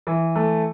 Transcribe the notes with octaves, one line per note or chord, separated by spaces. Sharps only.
E3
A3